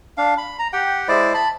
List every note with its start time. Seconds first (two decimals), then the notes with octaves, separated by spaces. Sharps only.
0.18 D4 F5
0.38 B5
0.59 A#5
0.73 G4 F#5 G5
1.08 G#3 E4 C5 D5
1.34 A5 B5